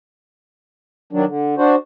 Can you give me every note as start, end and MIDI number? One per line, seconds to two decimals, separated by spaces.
1.13 1.25 51
1.13 1.25 54
1.13 1.25 62
1.27 1.55 50
1.57 1.75 62
1.57 1.75 66
1.57 1.75 72